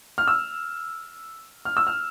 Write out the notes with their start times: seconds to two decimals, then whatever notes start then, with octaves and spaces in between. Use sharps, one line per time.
0.18 F6
0.28 E6
1.65 F6
1.77 E6
1.87 F6